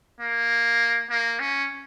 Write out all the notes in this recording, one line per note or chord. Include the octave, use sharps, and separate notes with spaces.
A#3
A#3
C#4